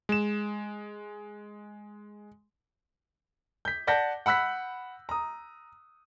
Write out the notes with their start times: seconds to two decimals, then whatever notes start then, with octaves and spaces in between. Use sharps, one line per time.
0.09 G#3 E7
3.65 G6 B6
3.87 D5 F#5 A5 G6 A#6 B6
4.26 F#5 B5 E6 F#6 B6
5.09 A#5 D#6